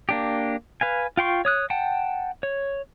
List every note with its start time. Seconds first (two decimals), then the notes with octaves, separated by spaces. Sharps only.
0.09 A#3 D4 G4
0.81 B4 F5 G#5
1.17 F4 G5 C6 C#6
1.45 C#5 D#6 F#6
1.70 F#5 G5 A5
2.43 C#5